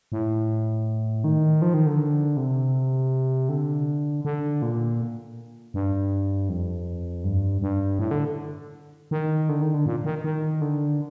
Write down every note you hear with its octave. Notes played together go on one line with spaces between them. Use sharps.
A2
D#3
F3
D#3
D3
C3
D3
D3
A#2
G2
F2
G2
G2
A2
D3
D#3
D3
D#3
D3
A#2
D#3
D#3
D3